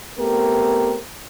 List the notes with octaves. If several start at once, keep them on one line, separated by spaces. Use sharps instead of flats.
A3 B3 C4 G4 A#4